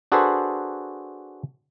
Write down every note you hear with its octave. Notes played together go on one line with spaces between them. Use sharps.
D4 F#4 G#4 A4 B4 C5